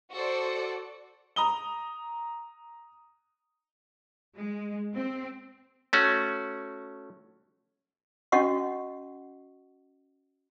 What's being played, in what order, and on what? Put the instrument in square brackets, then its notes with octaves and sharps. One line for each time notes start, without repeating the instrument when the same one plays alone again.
[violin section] F#4 A4 C5 D5
[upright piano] A#5 D#6 G7
[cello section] G#3
C4
[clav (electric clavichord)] A3 C#4 F#4
[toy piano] C#4 F#4 D#5 F#5 C#6